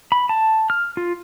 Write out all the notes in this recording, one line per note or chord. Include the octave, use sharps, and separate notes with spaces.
B5
A5
F6
F4